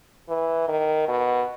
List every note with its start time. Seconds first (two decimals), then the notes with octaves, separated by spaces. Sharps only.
0.29 E3
0.68 D#3
1.08 B2